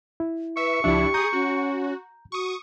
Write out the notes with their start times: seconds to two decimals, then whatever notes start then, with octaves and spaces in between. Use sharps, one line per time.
0.20 E4
0.57 B4 E5 C#6
0.84 C#2 F3 D4 E4 G4 E5
1.14 G#4 A#5 D#6 G6
1.33 C#4 F#4
2.32 F#4 C#6 D#6